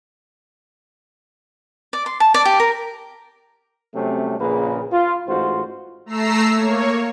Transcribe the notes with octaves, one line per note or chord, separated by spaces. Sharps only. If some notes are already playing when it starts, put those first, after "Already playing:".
D5
C6
A5
D5
G4
A#4
C3 F#3 G3 A3 C4 C#4
A#1 A#2 C#3 A#3 G#4 B4
F4
A1 G#2 F4 F#4 C5
A3 A#5 E6 C7
A#3 C#5